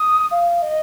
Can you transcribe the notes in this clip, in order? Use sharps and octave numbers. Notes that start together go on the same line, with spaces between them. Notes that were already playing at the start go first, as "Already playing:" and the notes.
Already playing: D#6
F5
D#5